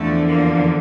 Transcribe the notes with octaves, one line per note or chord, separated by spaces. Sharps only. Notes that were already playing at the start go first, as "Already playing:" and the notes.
Already playing: E2 D3 F3 A3
A#3